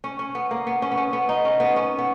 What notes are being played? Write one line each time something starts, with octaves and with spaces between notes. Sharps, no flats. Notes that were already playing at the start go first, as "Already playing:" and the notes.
C#4
C#4
B3
A#3
B3
C#4
B3
C#4
B3
D#4
C#4
B3
C#4
B3